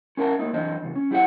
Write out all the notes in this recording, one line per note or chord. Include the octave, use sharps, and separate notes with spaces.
C#4 A#4 E5 A5 A#5
A3 A#3 D#4
F#2 E3 D4 C5 D#5
E2 C#3
C#4
F#3 E4 G4 G#4 C5 F#5